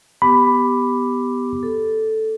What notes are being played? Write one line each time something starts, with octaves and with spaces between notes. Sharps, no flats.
B3 G4 B5 D6
A4